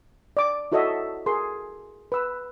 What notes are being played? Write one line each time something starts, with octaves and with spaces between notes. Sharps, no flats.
D5 D6
E4 F#4 A4 C#5 D#5 E5
G#4 A#4 C6
B4 E6